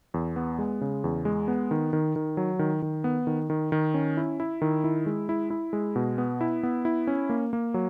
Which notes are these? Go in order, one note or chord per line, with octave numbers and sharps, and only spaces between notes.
E2
B3
G#3
C#3
E2
G#3
B3
D#3
D#3
D#3
F#3
D#3
D#3
B3
D#3
D#3
D#3
C#4
E4
E4
D#3
E4
G#3
E4
E4
G#3
B2
B3
E4
B3
E4
C#4
A#3
A#3
F#3